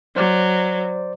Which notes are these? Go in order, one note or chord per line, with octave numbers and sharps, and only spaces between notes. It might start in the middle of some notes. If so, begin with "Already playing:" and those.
F#3 C5 D5